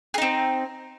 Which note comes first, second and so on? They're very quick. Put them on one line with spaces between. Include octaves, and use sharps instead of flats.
G#4 D#4 C4